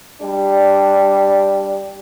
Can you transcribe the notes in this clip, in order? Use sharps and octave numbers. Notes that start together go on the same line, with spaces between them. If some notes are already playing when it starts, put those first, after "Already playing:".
G3 D4